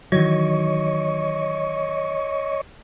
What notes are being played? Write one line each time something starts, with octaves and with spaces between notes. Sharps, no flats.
D#3 E3 F#3 C#5 D#5 C#6